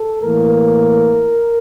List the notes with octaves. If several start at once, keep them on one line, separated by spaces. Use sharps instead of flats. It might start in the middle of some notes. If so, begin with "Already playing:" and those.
Already playing: A4
A2 E3 A#3 A#4
A#4